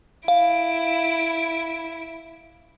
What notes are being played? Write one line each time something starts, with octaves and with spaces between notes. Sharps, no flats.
E4 F5 D7